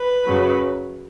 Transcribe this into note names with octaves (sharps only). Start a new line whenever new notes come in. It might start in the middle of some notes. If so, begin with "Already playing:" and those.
Already playing: B4
F#2 C#3 F#3